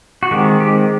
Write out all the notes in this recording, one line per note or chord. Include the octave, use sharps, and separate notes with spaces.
F#4
D#3 G#3 C4 G4
G4